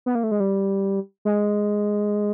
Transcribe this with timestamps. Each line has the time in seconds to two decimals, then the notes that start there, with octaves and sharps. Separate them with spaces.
0.06 B3
0.15 A#3
0.24 A3
0.31 G#3
0.40 G3
1.25 G#3